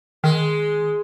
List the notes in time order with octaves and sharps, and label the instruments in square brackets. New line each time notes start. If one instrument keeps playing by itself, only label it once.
[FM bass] D#3 [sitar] G#3